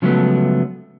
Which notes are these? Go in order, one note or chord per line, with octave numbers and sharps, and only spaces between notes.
C#3 F3 F#3 G#3 A3 B3